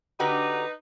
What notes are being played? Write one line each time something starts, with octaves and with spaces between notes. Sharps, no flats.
D3 D#4 F#4 G4 B4 A#5